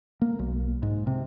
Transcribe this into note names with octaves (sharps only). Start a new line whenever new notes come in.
A#3
B1
G#2
C3